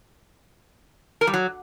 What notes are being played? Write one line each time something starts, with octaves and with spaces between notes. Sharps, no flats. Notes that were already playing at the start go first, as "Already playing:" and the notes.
A#4
G3
F#3